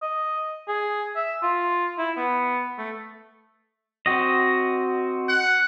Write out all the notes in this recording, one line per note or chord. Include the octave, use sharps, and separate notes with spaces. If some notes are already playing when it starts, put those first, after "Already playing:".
D#5
G#4
E5
F4
E4
B3
A3
C4 F#4 D#5
F#5